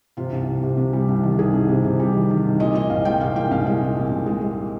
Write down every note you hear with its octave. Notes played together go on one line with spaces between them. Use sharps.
C3 F4
C2
C3
C3
C3
G3
C2
D#3
C2 G#4
C2
C3
C3
G3
D#3
D#3
C2
A#2 D#5
A#2 D#5
C2 F5
G#3 G5
C2 F5
A#2 G5
C2 F5
G#3 D#5
C2
A#2
C2
G#3
G#3